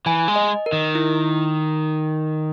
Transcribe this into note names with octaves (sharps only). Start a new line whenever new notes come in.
E3 G#5
G#3
D#5
A#4
D#3
E4